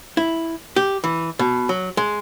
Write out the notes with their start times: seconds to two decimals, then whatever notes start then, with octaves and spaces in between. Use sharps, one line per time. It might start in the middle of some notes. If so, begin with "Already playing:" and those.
0.17 E4
0.76 G4
1.04 E3
1.39 B2
1.69 F#3
1.97 G#3